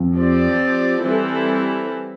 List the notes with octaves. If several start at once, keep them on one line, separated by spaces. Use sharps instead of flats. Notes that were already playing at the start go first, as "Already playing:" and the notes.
Already playing: F2
F3 C4 G4 D5
E3 G3 C4 E4 A4